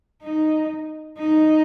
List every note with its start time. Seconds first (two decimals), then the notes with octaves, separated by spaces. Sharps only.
0.23 D#4
1.19 D#4